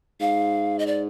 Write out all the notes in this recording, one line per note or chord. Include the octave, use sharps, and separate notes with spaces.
G#2 F5
D#5
D5